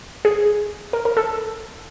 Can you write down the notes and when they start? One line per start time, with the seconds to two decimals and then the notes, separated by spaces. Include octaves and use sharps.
0.25 G#4
0.93 A#4
1.05 A#4
1.17 A4